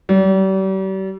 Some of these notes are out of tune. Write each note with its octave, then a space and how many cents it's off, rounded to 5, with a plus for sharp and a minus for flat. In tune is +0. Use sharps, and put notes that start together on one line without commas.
G3 -40